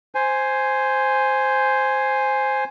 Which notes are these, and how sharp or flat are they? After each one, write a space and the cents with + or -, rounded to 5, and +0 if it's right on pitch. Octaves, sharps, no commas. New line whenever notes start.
C5 +0 G#5 +0